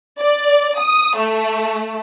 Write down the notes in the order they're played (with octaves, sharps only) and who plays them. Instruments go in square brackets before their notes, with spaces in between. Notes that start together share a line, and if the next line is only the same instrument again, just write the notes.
[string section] D5
D#6
A3